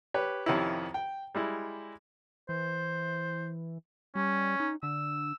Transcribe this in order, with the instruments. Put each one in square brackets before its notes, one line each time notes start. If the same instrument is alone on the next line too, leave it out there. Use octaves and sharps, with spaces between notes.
[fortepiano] G4 B4 C#5
F2 C3 D#3 C#4 D#4 E4
G5
G3 G#3 E4
[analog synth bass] E3 [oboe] C5
[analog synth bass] G3 [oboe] C#4
[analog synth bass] D#4
[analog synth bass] D3 [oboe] E6